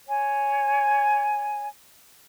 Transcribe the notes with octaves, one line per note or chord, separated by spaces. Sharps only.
C#5 G#5